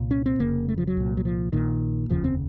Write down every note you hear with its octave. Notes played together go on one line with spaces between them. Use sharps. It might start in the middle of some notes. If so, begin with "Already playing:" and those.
Already playing: C2 A#2
C#4
C4
F1 F2 C#3 A#3
A3
F3
F#3
C2 A#2
F#3
F3
A#1 A#2 D#3
F1 D#2 C#3 F3
C4